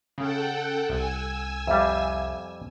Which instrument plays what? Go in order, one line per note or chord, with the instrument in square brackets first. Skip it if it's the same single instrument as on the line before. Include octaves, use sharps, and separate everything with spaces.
[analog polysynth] C#3 [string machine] A4 F#5 G5
[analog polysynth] C2 [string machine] G#5 E6
[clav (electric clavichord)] F2 G3 [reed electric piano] E5 F5